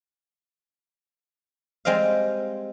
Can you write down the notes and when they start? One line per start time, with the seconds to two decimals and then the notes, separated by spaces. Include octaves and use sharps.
1.85 G3 G#3 C4 D#5 F5